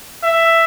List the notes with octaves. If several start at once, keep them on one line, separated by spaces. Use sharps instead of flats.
E5